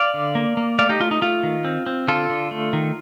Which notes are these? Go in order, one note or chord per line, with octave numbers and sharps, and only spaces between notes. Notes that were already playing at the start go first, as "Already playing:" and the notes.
Already playing: D5 F5
D3
A#3
A#3
A3 D5 F5
D#4 G4
A3 F4
D#4
A3 F4
D#3
C4
C4
D3 F4 A4
D3
A3
D#3